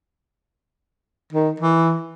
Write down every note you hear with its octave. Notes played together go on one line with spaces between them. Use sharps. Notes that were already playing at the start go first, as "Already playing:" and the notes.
D#3
E3